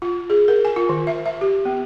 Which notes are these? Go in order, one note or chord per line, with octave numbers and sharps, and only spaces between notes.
F4
G#4
A#4
G#5
F4
D#3
E5
E5
G4
B3